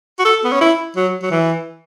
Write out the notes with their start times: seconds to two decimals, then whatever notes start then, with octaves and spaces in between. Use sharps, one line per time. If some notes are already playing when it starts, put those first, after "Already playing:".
0.19 F#4
0.25 A4
0.45 B3
0.52 C#4
0.61 E4
0.96 F#3
1.22 F#3
1.31 E3